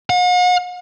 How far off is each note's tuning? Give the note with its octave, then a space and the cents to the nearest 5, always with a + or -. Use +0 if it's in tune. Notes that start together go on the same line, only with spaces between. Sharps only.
F#5 -45